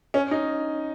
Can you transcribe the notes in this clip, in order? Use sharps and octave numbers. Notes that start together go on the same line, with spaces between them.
C#4
D#4